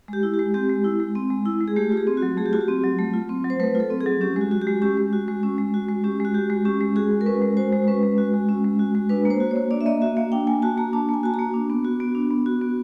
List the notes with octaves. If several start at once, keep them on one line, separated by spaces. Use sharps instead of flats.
G#3 G4
E4
G4
G#3
C4 G4
G#3
E4
G#3
C4
G#3
E4
G#3
G#4
A3 G4
G4
F4
G#4
C4
F#4
F#3
A3 G#4
G4
F4 F#4
G4
C4
F#3
A3
F4
C4
F#3
C5
A3 B4
F4 A4
C4
G#4
F#3
C#4 G4
G#3 F#4
F#4
G4
G#3
C#4 G4
G#3
F#4
G#3
C#4
G#3
F#4
G#3
C#4 G4
G#3 F#4
F#4 G4
G#3
C#4 G4
G#3
F#4 G#4
G#3
A#4
C#4 B4
G#3
F#4 C5
G#3
C#4 B4
G#3
F#4
G#3
C#4
G#3
F#4
G#3
D4 B4
A#3
C5
F#4
C#5
A#3
D4 D5
E5
A#3 D#5
F#4 E5
A#3 F5
D4 G5
A#3 G#5
F#4 A5
A#3 A#5
D4 A5
A#3 G#5
F#4 A5
A#5
A#3
D4
B3
F#4
B3
D4
B3
F#4
B3